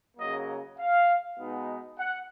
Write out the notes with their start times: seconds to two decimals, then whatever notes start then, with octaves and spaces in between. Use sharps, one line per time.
0.17 C#3 F#3 A#3 D#5
0.78 F5
1.38 B2 G#3 B3 D#4
1.98 F#5